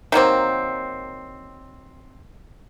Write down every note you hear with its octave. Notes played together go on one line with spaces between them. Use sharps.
D#3 F#3 A#3 C4